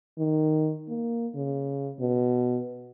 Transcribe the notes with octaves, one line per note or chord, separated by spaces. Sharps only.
D#3
A#3
C#3
B2